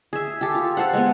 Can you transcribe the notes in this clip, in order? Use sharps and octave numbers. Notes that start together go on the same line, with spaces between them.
G#4 E5
G4 A4
F4
A4 C5 F5 F#5
G#3 B3